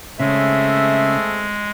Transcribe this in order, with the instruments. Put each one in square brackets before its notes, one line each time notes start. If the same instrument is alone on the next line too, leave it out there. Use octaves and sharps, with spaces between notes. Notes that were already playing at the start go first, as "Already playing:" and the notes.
[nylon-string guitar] C#3 [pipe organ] G#3 [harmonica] A3 C4 G#4 [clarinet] E5